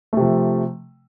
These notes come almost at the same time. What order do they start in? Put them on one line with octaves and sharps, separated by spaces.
A3 C3 F3